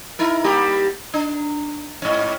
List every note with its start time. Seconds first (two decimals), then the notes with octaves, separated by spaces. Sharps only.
0.19 D#4 E4 A#4
0.44 G3 A#3 G4
1.14 D4
2.02 G#2 C#4